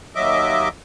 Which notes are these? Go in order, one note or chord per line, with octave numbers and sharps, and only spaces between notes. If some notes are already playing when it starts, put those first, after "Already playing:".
D#2 F#3 D#5 E5 D6